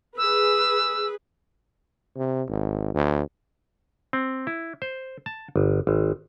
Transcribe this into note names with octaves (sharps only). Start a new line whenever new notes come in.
G#4 B4 E6
C3
G#1
D2
C4
E4
C5
A5
G1
G#1